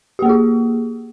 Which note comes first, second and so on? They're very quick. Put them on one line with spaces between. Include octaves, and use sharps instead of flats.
G4 A#3 G#4 F4